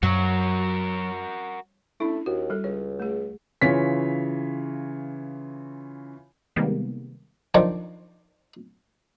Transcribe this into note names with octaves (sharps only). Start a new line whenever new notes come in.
F#2 F#3 F#4 A#4
A3 C#4 D4 E4
D#2 F#4
G3 A4
C#2 C#5
A3 G#4
C#3 E3 F4 C#5 B6
C3 D#3 G3 G#3 A#3 B3
D#3 F3 D4